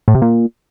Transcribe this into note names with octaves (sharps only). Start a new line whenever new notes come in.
A2
C3
A#2